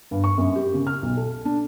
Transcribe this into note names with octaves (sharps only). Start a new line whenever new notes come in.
G2
C#6
F#2
G4
C#3
F6
B1
A4
D4